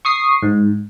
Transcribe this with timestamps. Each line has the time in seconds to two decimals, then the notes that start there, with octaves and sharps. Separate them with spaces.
0.05 C#6 D#6 C7
0.43 G#2